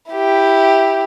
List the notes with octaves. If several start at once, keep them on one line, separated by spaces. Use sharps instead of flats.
E4 G4